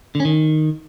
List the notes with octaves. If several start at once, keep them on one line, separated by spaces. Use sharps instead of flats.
D3
C#4
D#3